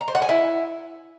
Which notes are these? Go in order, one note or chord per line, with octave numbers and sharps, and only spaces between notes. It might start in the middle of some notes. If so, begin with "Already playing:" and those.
A#5
C5
F#5
G#5
E4